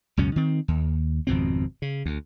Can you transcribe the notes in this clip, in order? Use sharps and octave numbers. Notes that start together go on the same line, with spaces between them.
C#2 F#2 B2 C#4
D#3 C4
D#2
G#1 F2 B2 C4
C#3
D2